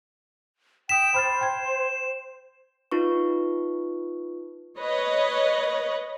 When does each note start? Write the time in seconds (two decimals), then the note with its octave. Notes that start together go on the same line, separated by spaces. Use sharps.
0.89 G5 D#6 B6 E7
1.14 C5 B5 F6 A6
1.41 G5 G#6
2.91 D#4 F4 B4 C#6
4.78 B4 C#5 D#5